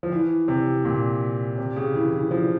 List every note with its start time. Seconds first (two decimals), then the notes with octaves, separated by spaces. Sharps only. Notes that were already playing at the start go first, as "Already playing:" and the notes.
0.03 F3
0.12 E3
0.48 C3
0.85 A#2
1.58 C3
1.76 C#3
1.94 E3
2.13 E3
2.31 F3